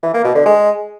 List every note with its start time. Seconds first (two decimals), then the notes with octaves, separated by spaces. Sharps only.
0.03 E3
0.14 A#3
0.24 B2
0.35 D3
0.46 G#3